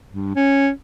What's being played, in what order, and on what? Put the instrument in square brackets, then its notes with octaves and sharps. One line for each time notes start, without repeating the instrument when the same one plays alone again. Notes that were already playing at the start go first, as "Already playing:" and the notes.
[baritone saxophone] G2
C#4